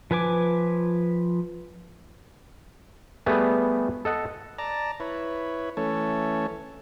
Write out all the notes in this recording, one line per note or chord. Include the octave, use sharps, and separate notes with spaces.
F3 B4 G#5 D6
G3 A3 B3 G#4 B4
A4 D#5 F#5
D5 A5 A#5
E4 B4 C#5
E3 A3 C#4 A4 C#5